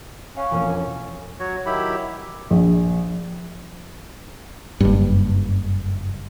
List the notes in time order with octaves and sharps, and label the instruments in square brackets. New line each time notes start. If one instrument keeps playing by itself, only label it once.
[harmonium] C#4 [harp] F5 F#5
[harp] E1 F2 A#3
[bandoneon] F#3 F#4 C#5
D#3 F#3 E4 G4 B5
[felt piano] A#1
[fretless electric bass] F#1 G2